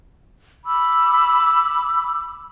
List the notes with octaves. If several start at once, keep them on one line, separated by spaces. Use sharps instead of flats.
B5 D6 E6